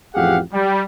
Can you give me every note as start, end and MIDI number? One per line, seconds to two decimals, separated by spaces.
0.14 0.38 33
0.14 0.38 41
0.14 0.38 67
0.14 0.38 68
0.14 0.38 77
0.14 0.38 78
0.53 0.83 55